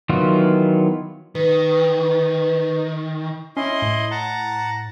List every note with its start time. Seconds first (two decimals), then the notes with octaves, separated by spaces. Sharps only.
0.09 D#3 E3 F#3 B3 F4
1.35 D#3 B4
3.57 C#4 E4 D#5 C6
3.82 A2
4.11 F#5 A5 A#5